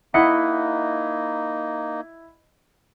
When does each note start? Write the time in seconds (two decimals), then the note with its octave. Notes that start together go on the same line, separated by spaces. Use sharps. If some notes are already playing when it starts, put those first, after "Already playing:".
0.14 A#3 D#4 E4 D#5 E5 F#5 B5 C#7